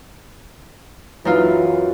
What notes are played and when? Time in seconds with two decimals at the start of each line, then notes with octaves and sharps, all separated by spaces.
1.25 F#2 E3 D#4 F4